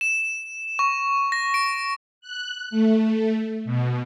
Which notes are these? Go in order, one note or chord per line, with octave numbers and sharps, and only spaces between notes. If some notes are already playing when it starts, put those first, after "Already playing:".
E7
C#6
A#6
D7
F#6
A3
B2